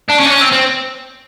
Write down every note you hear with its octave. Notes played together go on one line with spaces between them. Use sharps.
D4
C#4
D4
C#4
C4
C4